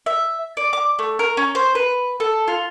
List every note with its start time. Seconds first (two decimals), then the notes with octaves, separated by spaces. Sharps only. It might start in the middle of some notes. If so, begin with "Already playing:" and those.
0.06 E5
0.57 D5
0.73 D6
0.99 A3
1.19 A#4
1.37 C#4
1.55 C5
1.75 B4
2.20 A4
2.48 F4